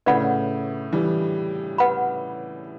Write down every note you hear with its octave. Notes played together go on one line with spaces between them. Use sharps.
A2 C#3 B4 D5 F#5 B5
E3 G3
B4 F#5 B5